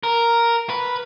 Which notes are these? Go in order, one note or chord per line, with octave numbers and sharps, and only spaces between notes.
A#4
B4